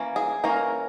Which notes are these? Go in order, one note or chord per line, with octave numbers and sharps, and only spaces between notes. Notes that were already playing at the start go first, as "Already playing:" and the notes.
Already playing: E3 A#3 C#4
G#4
E3 A#3 C#4 A#4